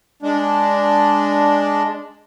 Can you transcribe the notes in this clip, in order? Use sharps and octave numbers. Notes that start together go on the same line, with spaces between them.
G#3 D4